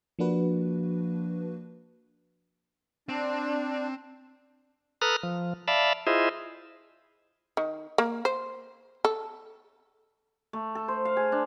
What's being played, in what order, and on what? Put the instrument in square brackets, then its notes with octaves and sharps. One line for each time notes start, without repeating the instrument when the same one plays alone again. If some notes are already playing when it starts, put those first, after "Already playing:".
[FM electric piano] F3 A#3 D4 F#4 B4
[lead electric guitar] C4 [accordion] D4
[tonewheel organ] A4 B4 A#5 D#6 F6 F#6
F3
D5 E5 F5 A5 B5
E4 F4 G#4 C5 D#5 E5
[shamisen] D#3
A#3
C5
A4
[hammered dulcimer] A3
A4
C5
F5
G#4
D4